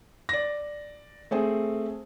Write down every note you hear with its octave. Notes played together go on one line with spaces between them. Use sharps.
D5 A#6
A3 C4 G#4